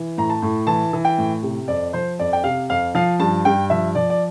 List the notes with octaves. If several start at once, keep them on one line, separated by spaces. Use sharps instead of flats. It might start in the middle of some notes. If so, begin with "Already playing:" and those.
Already playing: E3
A2 A#5
A5
A2
E3 A5
E3
G5
A2
C3
F2 D5
F3 C5
F2 D5
G5
C3 F5
F2 F5
F3 F5
G2 A5
G2 G5
F3 E5
F3 D5
D5